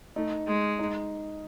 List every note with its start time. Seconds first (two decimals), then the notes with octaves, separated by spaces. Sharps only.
0.16 A3 D#4
0.47 G#3
0.79 D#4